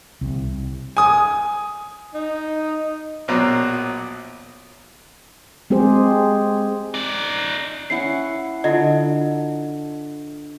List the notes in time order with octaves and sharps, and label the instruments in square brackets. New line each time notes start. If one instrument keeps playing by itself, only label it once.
[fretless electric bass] C2
[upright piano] G#5 D#6
[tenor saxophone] D#4
[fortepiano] A#1 B2 F#3 C5 D5 A#5
[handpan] G#3 C4 G4 G#4 C5
[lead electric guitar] D#4 D5
[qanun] C#4 E4 F#5 [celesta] C7
[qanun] D3 [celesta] F4 D#5